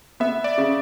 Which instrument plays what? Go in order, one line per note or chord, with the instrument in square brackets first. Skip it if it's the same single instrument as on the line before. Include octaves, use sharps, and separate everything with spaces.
[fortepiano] B3 [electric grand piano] E5
[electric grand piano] D5
[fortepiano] C#3